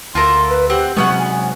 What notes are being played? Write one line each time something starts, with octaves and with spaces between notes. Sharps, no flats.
D2 F4 A4 A#4 C6
B4
C4 G4 F#5
C3 F#3 G#3 B3 C#4 F#5 C#6
G#5